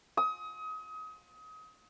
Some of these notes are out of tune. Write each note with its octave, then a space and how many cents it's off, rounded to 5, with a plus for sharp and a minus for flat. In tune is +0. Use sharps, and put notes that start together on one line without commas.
D#6 +30